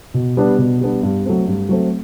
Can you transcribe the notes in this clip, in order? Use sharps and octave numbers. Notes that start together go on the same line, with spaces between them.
B2
G3 B3 D4
B2
G3 B3 D4
G2
F#3 A3 C4
G2
F#3 A3 C4